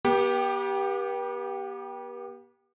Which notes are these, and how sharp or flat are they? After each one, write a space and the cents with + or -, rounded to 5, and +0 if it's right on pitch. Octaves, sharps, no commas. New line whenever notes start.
B3 -45 G4 +0